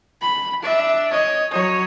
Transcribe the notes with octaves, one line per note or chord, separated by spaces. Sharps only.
B5
D4 E5
C#5 D#5
F#3 C#5 D#5